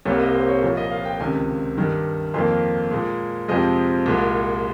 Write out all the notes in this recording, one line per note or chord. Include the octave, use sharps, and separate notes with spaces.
C2 C3 G3 A#3 C#5
D#5
C5
C#5
C2 A#2 F3 C#5
D#5
F5
G5
C#2 C3 D#3 G#5
G2 D#3 G3
F2 D#3 A#3 C6
A#2 G#3
F2 C3 F3 G#3 D#5
C2 A#2 G#3